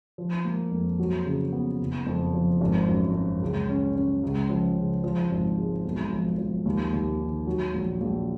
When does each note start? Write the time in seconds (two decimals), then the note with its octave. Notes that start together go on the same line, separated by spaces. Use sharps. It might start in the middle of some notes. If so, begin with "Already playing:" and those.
0.18 F3
0.45 A#3
0.71 F2
0.99 F#3
1.26 C#3
1.53 B3
1.80 F#1
2.06 F2
2.34 F3
2.61 G#1
2.88 F#2
3.14 F#2
3.42 C#2
3.69 C#4
3.95 C#4
4.23 C#2
4.50 F3
4.76 C#3
5.04 F3
5.31 G#1
5.58 G#3
5.85 B1
6.12 F3
6.38 F3
6.65 D#2
6.93 D#2
7.19 D#3
7.47 F#3
7.74 A#1
8.01 A#1